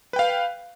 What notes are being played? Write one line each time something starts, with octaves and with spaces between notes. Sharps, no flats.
B4 F5 G5